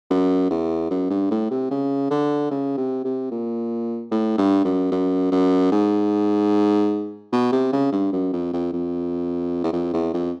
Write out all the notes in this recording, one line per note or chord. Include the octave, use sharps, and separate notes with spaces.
F#2
E2
F#2
G2
A2
C3
C#3
D3
C#3
C3
C3
A#2
A2
G2
F#2
F#2
F#2
G#2
B2
C3
C#3
G2
F#2
F2
F2
F2
E2
F2
E2
F2